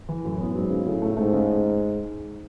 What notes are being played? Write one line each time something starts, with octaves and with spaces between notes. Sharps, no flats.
E3
F#2 A2
B3
G#2 F#3
C#3
A2 C#3
A3
G#2 A3
C#3